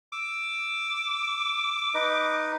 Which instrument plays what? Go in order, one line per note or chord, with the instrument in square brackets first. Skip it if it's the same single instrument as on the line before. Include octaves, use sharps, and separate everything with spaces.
[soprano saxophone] D6 [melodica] E6
[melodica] D#4 B4 D#5